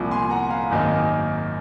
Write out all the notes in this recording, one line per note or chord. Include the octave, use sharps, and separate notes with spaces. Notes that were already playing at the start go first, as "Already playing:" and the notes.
Already playing: C2 A#2 F3
G#5 C6
F#5 A#5
F5 G#5
G#1 F#2 D#3 A#3 D#4